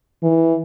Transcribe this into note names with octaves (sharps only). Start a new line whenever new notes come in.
E3